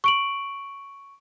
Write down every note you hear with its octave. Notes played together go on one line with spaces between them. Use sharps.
C#6 D7 F#7